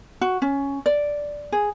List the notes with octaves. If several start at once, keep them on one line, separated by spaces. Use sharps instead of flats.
F#4
C#4
D5
G#4